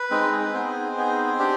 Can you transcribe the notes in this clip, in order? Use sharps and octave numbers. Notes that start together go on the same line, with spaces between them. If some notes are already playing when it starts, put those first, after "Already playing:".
Already playing: B4
G#3 C4 D#4
G#4
B4
B3 C4 D#4 G#4 C5
B3 D#4 G#4
D4 G4